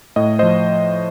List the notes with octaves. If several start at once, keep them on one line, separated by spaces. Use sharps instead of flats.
A2 D#5
F3 C5 D#5